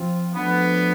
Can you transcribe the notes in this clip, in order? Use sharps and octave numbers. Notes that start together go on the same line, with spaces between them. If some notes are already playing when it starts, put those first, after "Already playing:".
Already playing: F3 C4 F4
F3 A3 B3 D4